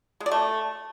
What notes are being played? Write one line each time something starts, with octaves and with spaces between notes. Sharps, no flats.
G#3
D5
A3